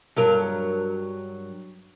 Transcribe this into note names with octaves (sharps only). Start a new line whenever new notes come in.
G2 F#3 A#4